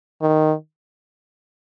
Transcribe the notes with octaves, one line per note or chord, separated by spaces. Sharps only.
D#3